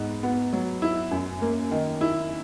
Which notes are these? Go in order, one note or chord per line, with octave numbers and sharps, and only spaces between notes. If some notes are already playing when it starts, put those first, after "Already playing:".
Already playing: G#2 B3
B3
F#3
E4
F#2
A#3
D#3
E4